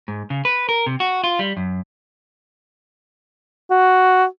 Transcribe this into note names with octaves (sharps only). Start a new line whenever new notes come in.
G#2
C#3
B4
A#4
C3
F#4
F4
G3
F#2
F#4